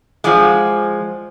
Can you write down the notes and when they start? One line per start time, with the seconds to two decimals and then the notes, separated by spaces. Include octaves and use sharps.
0.24 F3 G#3 D5 F#5 G#5